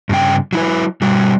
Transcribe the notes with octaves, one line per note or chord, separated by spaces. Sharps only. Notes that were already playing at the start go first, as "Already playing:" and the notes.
G2 C#3 G5
F#3 E4 B4
B2 G3 F#4